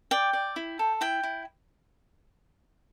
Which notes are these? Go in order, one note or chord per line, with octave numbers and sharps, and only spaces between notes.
D5 G5
D5
E4
A4
E4 G5
E4